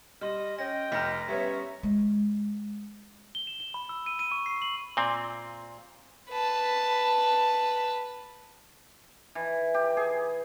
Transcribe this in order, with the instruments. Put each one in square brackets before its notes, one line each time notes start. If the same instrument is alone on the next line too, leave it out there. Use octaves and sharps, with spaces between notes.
[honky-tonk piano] G3 [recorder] D#5 [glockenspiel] C6 F6
[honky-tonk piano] C#4 [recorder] D#5 [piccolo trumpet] G5 [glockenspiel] A#6
[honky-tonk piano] F1 F6 [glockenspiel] A#5 A#6 B6
[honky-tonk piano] G3 B3 C#4 [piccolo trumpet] C#5 [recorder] E5
[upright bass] G#3
[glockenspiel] G7
E7
G7
B5
E6
D#7
D#7
C#6
C7
F#7
[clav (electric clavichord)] A#2 C4
[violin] B4 A5
[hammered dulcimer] E3
G4
G#4